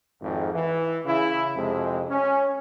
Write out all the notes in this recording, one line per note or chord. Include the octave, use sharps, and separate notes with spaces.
G#1 F2
E3
C#3 E4
F2 C3 G#3
C#4